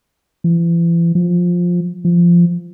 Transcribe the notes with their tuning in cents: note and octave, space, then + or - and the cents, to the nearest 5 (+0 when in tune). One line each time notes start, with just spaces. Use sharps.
E3 +40
F3 +10
F3 -15